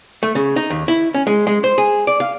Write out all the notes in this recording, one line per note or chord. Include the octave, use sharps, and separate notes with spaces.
A3
C#3
D#4
D#2
E4
C#4
G#3
G#3
C5
G#4
D5
F5